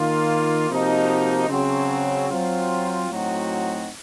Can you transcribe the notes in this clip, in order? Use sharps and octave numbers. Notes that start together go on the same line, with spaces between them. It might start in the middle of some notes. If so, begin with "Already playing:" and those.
Already playing: D#3 A#3 F4
C3 F3 A#3 D#4 F#4
C#3 F#3 C4
F#3 C4 F4
A2 F#3 C4 D#4 F#4